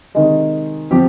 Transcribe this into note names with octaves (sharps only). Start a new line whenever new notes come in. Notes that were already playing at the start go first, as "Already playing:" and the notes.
C3 D#3 G#3
C3 F3 C4 G4